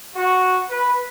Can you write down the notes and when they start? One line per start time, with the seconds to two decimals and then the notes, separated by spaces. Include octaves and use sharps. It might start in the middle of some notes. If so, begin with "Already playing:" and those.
0.15 F#4
0.69 B4